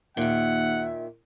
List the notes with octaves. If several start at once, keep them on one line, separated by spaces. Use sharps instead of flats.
D#2 A#2 D#3 E5 F#5